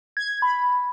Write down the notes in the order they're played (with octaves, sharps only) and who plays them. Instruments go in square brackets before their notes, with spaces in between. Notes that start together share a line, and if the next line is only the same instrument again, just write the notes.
[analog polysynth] G#6
B5